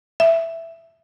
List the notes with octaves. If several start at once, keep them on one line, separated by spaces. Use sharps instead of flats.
E5